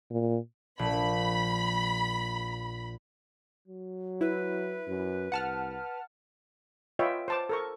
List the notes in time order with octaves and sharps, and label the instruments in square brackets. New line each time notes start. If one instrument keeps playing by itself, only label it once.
[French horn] A#2
[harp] A#1 [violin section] B5
[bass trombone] F#3
[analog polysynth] E4 [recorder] B4
[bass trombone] F#2
[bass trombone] C2 [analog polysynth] F#5 A5 F6
[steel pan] F4 B4 C#5 D#5 E5 G5
C5 A5 D6
A4 A#4 C#6